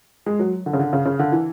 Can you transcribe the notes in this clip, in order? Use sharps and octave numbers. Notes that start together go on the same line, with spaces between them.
G#3
F#3
D3
C#3
D3
C#3
C#3
D3
E3